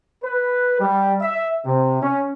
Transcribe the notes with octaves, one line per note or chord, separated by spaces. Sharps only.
B4
G3
E5
C3
C#4